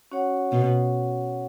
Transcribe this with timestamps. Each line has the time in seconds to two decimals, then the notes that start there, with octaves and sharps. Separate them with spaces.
0.12 C#4 F#4 C#5 F#5
0.52 B2